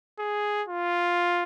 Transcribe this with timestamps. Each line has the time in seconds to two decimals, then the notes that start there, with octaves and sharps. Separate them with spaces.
0.19 G#4
0.69 F4